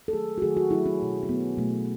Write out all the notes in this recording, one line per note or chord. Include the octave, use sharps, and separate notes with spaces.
A4
D#3 F#3 A3 G#4
F#4
D#3 F#3 A3 G#4
F#4
D#3 F#3 A3 E4
C#4
B2 F#3 A3
C#4
B2 F#3 A3 B3
B2 F#3 A3